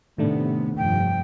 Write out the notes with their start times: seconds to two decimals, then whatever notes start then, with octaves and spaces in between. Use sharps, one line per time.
0.18 A2 C3 D#3 A3 B3 D4
0.77 F1 G2 F3 G5